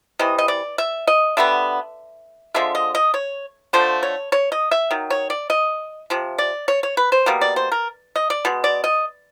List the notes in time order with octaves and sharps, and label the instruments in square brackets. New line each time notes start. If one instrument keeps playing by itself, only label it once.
[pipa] C3 E3 D#5
D#5
D5
E5
D#5
D3 G3 B3 E5
D3 F3 G#3 E5
D#5
D#5
C#5
D3 F3 A3 C5
C#5
C#5
D#5
E5
D#3 F#3
C#5
D5
D#5
C3 F3
D5
C#5
C#5
B4
C5
B2 G3 A#3
D5
C5
A#4
D#5
D5
B2 G#3
D5
D#5